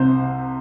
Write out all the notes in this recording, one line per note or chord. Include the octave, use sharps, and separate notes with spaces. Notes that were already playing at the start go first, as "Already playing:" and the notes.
Already playing: C2 C3 C5